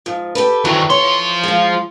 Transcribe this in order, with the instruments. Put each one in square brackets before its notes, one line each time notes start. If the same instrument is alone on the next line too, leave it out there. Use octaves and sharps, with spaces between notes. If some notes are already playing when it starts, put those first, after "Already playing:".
[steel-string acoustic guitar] G#2 F3
G4 A4 B4
[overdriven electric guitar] D#3 F#3 [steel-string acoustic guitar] E3
[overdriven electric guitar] F3 C6 [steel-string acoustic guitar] C#5
[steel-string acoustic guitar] G#3 F4